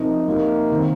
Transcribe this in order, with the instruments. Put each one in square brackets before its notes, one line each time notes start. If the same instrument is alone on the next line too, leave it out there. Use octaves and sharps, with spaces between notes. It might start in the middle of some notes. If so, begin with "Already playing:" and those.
Already playing: [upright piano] C3 F3 D#4 A#4
[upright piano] F2 C3 G3 D#4 A#4 [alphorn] A#3
[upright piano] D#3 C4